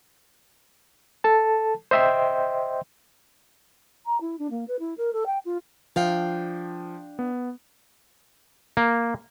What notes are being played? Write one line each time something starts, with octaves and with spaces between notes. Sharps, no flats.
A4 A5
C5 D#5 E5 G5 C6
A#5
E4
D4
A#3
B4
E4
A#4
A4
G5
F4
F3 D4 F5 G5
B3
A#3